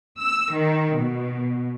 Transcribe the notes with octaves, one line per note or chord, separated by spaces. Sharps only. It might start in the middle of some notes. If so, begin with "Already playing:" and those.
E6
D#3
B2